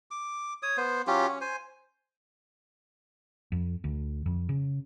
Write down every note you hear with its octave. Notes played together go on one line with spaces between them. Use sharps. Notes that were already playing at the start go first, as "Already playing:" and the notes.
D6
C#5 D#6
B3 C5
F#3 C#4 F4 G4
C#4
C5 G#5
F2
D2
F2
C#3